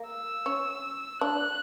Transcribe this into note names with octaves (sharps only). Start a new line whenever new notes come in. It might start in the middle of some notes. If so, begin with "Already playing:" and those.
Already playing: A#3
E6
C#4
D4 F#6